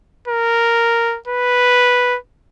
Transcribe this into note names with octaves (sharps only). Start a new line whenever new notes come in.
A#4
B4